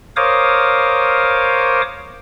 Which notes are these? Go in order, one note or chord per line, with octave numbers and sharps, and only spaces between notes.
A#4 C5 C#5 F5 D6 D#6